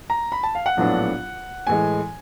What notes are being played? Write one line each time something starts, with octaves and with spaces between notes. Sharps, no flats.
A#5
B5
A5
F5
F#5
A#1 A2 F#3 B3 D4
A2 E3 G#3 G#5